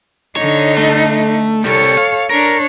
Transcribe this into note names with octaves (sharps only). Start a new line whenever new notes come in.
D3 D#4 C#5
A3
C2 G3 A4 C#5
F5
D4 A#4 C#5